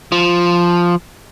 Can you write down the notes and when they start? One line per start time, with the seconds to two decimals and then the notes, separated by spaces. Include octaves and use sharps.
0.12 F3